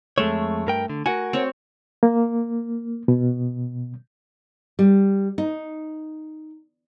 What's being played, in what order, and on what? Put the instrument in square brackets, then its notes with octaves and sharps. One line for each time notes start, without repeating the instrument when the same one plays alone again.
[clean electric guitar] F2 G#3 C#5 [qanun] A3
[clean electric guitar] G2 A#4 G5
D3
[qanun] F#4 [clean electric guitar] A#4 F#5 G#5
[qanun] C4 C#5
[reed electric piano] A#3
B2
[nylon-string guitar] G3
D#4